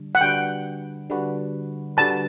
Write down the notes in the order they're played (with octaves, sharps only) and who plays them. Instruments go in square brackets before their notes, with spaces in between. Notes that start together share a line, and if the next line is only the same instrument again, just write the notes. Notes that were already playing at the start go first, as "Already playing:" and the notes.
Already playing: [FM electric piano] D3 G3 D4
[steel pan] F#5
[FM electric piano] D3 G3 D4 F#4 B4 [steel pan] G5
[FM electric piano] D3 G3 D4 F#4 B4
[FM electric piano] D3 G3 D4 F#4 B4 [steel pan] A5